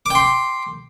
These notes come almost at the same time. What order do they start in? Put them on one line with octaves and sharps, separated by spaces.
D6 G5 C6